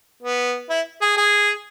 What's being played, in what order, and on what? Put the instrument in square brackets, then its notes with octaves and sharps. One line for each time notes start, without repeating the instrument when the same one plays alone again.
[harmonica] B3
E4
G#4
G#4